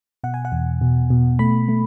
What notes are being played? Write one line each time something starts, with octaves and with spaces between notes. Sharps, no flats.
B2 F#5
G#5
F#5
E2
B2
B2
A3 B5
A3